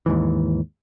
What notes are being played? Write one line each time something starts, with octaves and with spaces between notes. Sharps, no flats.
D#2 G#2 E3